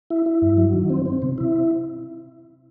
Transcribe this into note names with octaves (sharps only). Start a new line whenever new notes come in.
E4
E4
G2
F#3
D#3
C4
C4
C3
E4